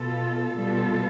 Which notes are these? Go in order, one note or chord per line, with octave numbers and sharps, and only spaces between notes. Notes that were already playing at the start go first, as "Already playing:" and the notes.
Already playing: B2 B3 F4 A4
B2 G3 B3 F4 A4